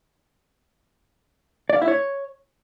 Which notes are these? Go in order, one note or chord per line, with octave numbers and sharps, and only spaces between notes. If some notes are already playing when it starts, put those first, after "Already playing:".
D5
F5
E4
C#5